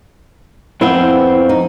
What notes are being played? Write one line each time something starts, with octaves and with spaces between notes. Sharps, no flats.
F2 B3 C4 E4 C5
D#4